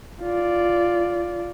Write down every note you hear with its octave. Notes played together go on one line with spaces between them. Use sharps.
F4 D5